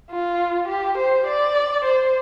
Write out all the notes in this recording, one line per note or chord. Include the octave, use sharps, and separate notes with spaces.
F4
G4
C5
D5
C5